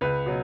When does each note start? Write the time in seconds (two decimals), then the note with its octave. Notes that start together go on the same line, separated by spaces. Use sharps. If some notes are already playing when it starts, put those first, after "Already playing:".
0.01 C#2 B4
0.26 B2 F#3